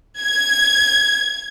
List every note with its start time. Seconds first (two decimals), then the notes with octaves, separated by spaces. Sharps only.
0.20 G#6